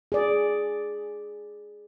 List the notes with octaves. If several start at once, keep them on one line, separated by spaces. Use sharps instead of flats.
G#4 D5